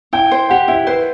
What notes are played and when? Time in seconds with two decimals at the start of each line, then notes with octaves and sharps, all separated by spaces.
0.13 E4 G5
0.31 C5
0.50 G4 F#5
0.68 E4 E5
0.87 B4 C5